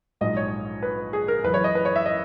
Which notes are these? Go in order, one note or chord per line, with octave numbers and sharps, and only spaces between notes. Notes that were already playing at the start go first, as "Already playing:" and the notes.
A#1 G#2 F#3 D#5
C#5
B4
G#4
A#4
F#1 F#2 E3 B4
C#5
D#5
B4
C#5
E5
D#5